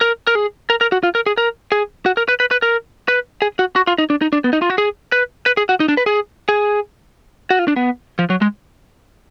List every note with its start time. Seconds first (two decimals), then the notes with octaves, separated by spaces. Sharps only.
0.01 A#4
0.27 A#4
0.35 G#4
0.70 A#4
0.81 A#4
0.92 F#4
1.03 F4
1.15 A#4
1.26 G#4
1.37 A#4
1.72 G#4
2.06 F#4
2.17 A#4
2.28 B4
2.40 B4
2.51 B4
2.62 A#4
3.08 B4
3.42 G#4
3.59 F#4
3.76 F#4
3.87 F4
3.98 D#4
4.10 D4
4.21 D#4
4.33 D4
4.44 B3
4.53 D#4
4.62 F4
4.70 F#4
4.78 G#4
5.12 B4
5.46 B4
5.57 G#4
5.69 F#4
5.80 D#4
5.88 D4
5.97 B4
6.06 G#4
6.49 G#4
7.50 F#4
7.59 F4
7.68 D4
7.76 B3
8.19 F3
8.30 F#3
8.42 G#3